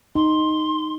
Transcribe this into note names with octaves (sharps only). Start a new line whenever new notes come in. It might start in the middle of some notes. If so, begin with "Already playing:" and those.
D#4 C6